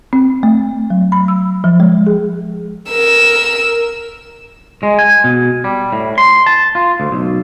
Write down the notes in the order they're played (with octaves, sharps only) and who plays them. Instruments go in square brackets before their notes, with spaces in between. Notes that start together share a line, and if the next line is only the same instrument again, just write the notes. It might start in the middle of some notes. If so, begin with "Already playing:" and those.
[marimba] C4
A3
F#3
B5
E6
F3
G#3
G#4
[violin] A#4 E6
[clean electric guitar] G#3
G#5
B2
G3
A2
C6
A5
F4
D2
B1